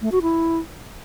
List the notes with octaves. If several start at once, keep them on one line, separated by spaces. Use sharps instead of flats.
A3
F#4
E4